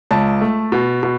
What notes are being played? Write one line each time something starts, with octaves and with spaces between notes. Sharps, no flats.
C#2 A5
A3
B2
B2